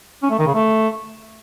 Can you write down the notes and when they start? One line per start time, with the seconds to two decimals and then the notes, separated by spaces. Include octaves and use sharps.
0.23 C#4
0.31 A3
0.39 D#3
0.47 C#3
0.55 A3